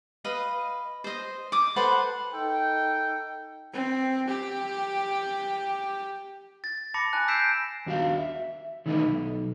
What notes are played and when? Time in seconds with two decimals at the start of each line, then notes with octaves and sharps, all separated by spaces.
0.24 B4 D#5 F5
1.04 C5 D#5
1.52 D6 D#6
1.76 A4 B4 C5 F#5
2.33 D#4 A4 G5
3.73 C4
4.28 G4
6.64 A6
6.94 A5 B5 D6 A#6 C#7
7.13 G#5 A5 F#6
7.28 E6 G6 B6 C7 D7 E7
7.86 D#2 D4 F#4 A4 F5
8.18 E5
8.86 D#3 E3 A3 D#4 E4
9.05 B1